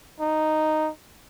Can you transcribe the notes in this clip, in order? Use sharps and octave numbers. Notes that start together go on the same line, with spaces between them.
D#4